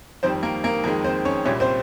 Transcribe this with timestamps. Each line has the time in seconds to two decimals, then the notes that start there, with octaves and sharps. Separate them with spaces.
0.23 F2 D#3 G3 C4 C5
0.43 A#3 A#4
0.63 A#3 A#4
0.84 F2 D#3 G#3 A#3 A#4
1.04 C4 C5
1.25 C#4 C#5
1.45 C2 A#2 G3 C#4 C#5
1.60 C4 C5